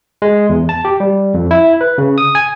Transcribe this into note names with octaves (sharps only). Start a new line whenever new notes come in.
G#3
E2
A5
G4
G3
F2
E4
B4
C#3
D#6
G#5